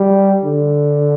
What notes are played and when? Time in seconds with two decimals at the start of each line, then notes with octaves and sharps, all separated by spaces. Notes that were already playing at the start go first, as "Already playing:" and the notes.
Already playing: G3
0.44 D3